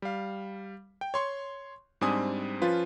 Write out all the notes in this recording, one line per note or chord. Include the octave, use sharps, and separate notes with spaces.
G3 F5
G5
C#5 C6 C#6
G#2 G3 C4 D4 G#5 D#6
F3 C#4 F4 B4